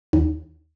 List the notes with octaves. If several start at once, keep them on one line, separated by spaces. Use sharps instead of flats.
D#2